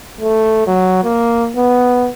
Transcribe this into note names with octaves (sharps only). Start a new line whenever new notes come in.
A3
F#3
A#3
B3